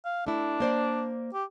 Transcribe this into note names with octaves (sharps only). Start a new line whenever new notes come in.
F5
A3 D4 E4
A#3 C5 D5
G4